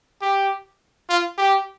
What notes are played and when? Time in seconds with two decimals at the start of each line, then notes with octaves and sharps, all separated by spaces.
0.22 G4
1.09 F4
1.38 G4